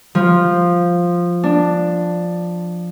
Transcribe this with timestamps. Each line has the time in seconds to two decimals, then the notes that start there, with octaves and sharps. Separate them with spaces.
0.15 F3
1.43 D4